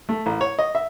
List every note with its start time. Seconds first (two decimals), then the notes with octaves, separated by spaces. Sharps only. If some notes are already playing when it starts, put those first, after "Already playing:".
0.09 A3
0.26 A1
0.41 C#5
0.59 D#5
0.75 E5